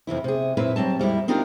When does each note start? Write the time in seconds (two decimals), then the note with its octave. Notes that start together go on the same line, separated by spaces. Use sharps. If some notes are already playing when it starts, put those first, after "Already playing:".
0.07 F2 C3 E3 E4
0.24 C3 G#4
0.57 F#2 A#2 C4 E4 B4
0.76 F#3 G3 C4 A5
0.99 F2 G3 G#3 E4
1.28 C4 D4 D#4 F4 G4 A#4